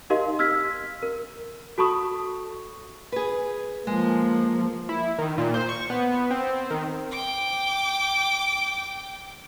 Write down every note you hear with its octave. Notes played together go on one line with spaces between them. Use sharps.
D#4 G4 A#4 D#5 F5 C6
E6 F6 G#6 B6
A#4
F#4 A4 A5 B5 C#6 D#6
G#4 B4
F3 G#3 A#3
E4
D#3
A#2
C5
C#6
B3
C4
D#3
G5 D6